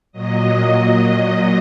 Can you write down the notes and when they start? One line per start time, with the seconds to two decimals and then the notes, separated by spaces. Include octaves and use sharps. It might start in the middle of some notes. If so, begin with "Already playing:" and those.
0.12 A#2 F#3 D#5
0.97 D#5